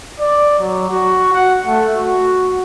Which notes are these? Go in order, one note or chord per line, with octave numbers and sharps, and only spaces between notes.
D5
F#3
F#4
F#5
A3
F#4